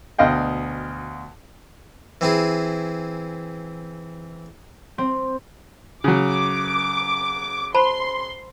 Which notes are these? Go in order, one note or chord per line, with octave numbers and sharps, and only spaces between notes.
D2 B2 D#5 F5 G5
E3 C4 E4 G#4
C4
C#3 F#3 D6
C5 A5 B5 C6